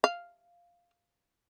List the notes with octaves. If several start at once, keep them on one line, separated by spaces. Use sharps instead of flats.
F5